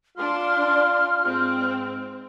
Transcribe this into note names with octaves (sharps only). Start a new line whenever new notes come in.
D4 F4 C6 F6
G#2 C4